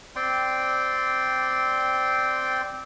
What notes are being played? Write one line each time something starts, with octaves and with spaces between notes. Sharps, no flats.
C4 D5 G5 C6